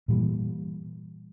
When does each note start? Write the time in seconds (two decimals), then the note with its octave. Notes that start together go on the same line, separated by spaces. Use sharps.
0.08 A#2 E3 G3